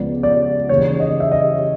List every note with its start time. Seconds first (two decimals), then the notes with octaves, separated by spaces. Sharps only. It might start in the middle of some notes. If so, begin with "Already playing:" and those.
Already playing: C#2 C#3 F3 G#3 B3 D5
0.23 D5
0.69 D#2 C#3 E3 C#5
1.00 D#5
1.20 E5
1.32 D#5